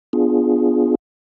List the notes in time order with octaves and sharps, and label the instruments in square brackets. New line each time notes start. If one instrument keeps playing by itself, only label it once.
[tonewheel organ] B3 D4 F4 G#4